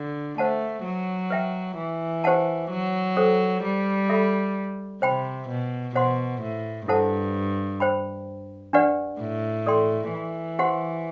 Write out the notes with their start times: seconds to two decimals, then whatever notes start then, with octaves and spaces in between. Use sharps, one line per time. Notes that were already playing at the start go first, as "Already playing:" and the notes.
Already playing: D3
0.38 A3 C5 F#5 A5
0.84 F#3
1.30 B4 E5 G5
1.77 E3
2.24 G4 C5 F#5 A5
2.71 F#3
3.17 A4 C5 G5
3.63 G3
4.09 A4 E5 B5
5.02 C3 C5 G5 B5
5.49 B2
5.95 B2 C5 F#5 C6
6.41 A2
6.87 G2 E4 A4 C5 F#5 A5
7.80 C5 G5 B5
8.73 D4 G4 B4 D5 F#5
9.20 A2
9.66 A4 D5 G5 C6
10.13 E3
10.59 G4 C5 F#5 C6